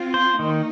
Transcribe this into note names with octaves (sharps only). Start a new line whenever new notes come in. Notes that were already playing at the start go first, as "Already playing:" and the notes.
Already playing: C4 F4
C5
D#3 A#3 D#4